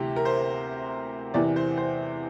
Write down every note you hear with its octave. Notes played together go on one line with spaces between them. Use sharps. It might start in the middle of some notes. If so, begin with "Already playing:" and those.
Already playing: D2 C3 E3 G4
A#4
C5
E2 C3 E3 D5
C5
C5